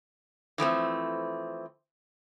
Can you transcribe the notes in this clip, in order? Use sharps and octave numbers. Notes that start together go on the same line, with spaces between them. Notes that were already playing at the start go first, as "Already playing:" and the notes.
E3 F3 A3 C4